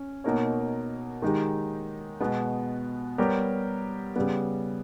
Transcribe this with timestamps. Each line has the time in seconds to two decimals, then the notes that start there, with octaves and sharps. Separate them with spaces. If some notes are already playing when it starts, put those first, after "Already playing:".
Already playing: C#4
0.24 B2 A#3 D#4 A#4 C#5
1.22 D#3 G#3 D#4 G4
2.21 B2 G#3 B3
3.18 G3 B3 G4 A#4 C#5
4.16 C#3 G3 B3